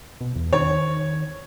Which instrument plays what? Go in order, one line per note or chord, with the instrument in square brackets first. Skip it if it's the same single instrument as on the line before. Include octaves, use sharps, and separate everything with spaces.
[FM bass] B2
E2
[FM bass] D#3 [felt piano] C#5